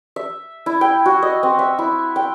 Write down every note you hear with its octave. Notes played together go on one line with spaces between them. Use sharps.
E5
E4
G5
F#4
D#5
C4
E5
E4
G5